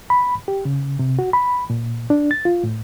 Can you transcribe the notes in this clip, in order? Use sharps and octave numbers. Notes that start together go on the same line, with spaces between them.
B5
G4
C#3
C3
F#4
B5
A#2
D4
A6
F4
A2